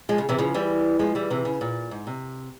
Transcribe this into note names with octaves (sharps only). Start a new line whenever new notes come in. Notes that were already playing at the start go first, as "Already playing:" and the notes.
F3 G#3
C#3
C3 E3
C#3 F3
E3 G3
F3 G#3
E3 G3
C3 E3
C#3
A#2
G#2
C3